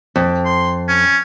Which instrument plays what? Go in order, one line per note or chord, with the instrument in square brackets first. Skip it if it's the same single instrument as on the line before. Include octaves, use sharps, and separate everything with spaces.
[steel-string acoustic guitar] F2
[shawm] C6
C#4